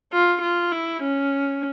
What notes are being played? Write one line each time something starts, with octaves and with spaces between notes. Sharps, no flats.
F4
F4
E4
C#4